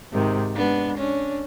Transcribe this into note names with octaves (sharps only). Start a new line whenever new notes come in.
G#2 C3 D#3
G#3 B3 D4
C#4 D4